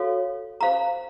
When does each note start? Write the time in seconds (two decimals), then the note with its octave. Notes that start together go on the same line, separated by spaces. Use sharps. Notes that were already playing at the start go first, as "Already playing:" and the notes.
Already playing: F#4 A4 C#5 F5
0.61 C5 F5 A#5